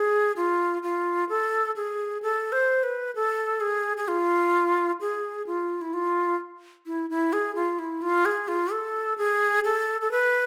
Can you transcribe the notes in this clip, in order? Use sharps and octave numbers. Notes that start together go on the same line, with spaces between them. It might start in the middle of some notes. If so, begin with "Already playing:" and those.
Already playing: G#4
F4
F4
A4
G#4
A4
C5
B4
A4
G#4
G#4
F4
G#4
F4
E4
F4
E4
E4
G#4
F4
E4
F4
G#4
F4
A4
G#4
A4
A4
B4